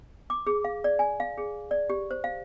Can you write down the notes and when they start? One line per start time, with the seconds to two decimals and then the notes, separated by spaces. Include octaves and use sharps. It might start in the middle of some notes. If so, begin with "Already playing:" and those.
0.30 D6
0.47 G#4
0.64 F5
0.84 D5
0.99 G#5
1.20 F5
1.38 G#4
1.71 D5
1.90 G4
2.11 C5
2.24 F5